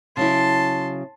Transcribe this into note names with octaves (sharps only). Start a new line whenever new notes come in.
C#3 F#3 E4 A5 C6